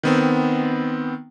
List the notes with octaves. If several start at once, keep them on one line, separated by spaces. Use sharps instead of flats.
D#3 B3 C4